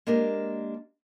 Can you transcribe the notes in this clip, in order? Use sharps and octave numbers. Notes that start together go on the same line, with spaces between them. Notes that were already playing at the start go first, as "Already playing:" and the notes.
G#3 A#3 D4 G4 A#4